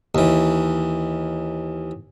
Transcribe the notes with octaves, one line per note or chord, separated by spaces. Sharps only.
D#2 E3